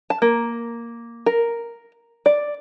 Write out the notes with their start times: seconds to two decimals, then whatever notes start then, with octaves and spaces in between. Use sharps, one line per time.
0.10 A5
0.22 A#3
1.26 A#4
2.26 D5